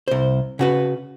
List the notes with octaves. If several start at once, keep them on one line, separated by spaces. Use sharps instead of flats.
C2 C5
C#3 F#4 B4